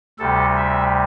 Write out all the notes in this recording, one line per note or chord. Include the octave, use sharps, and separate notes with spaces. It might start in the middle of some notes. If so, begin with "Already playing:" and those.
D2 C3 G3 A4
E5